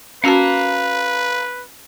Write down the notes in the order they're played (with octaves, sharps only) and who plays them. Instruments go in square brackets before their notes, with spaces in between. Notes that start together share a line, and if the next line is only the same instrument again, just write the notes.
[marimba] C#4 F#4 A5 [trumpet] B4 [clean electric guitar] F5 A#5